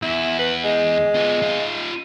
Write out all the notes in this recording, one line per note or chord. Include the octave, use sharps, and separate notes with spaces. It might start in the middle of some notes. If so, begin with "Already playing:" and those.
E2 E4
B4
G#3
B3 F4
D#4 F4